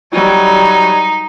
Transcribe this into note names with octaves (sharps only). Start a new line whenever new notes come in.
F#3 G3 D#4